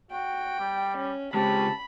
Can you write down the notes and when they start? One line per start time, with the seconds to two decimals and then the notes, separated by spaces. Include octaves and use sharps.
0.11 F#4 G5
0.59 G3
0.98 C#4
1.34 C#3 G#3 C4 G4 A5 B5